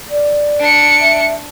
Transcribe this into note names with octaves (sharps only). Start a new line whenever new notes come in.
D5
D4 C#7
E5